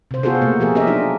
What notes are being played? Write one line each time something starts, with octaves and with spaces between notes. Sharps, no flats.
C3 C5
B3 F4 F#4 G#4 A4 C5
B2 A3 A#3
F3 G4 G#4 A#4
C#4 G4 A#4 D#5 E5
F#3 D4 D#4 F4